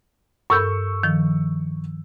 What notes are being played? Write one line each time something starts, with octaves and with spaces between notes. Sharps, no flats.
G2 A4 A#4 C#6 E6 G6
D#3 F3